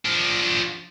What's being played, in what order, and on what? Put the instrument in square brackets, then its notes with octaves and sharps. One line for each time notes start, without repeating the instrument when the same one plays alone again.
[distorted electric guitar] F3 D4